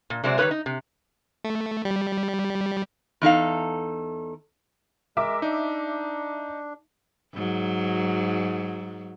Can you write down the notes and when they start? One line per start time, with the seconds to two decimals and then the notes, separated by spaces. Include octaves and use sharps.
0.10 A#2
0.24 C3 F#3 G#3 C5 D5
0.38 D#3 G3 B3 E4 B4 C#5
0.51 D#4
0.66 C3
1.44 A3
1.85 G3
3.22 E2 D#4 A4 F5
5.17 G#3 A#4 E5 D6
5.42 D4 D#4
7.34 G#2 F#3